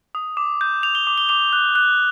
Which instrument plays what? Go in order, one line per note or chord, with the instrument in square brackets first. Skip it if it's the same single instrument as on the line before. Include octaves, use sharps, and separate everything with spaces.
[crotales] D#6
D6
G6
G6 F7
G7
D6
G7
D6 F7
F#6
F#6